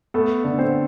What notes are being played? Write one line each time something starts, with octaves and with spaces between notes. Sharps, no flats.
A3 B3 A4
D3
C4 C5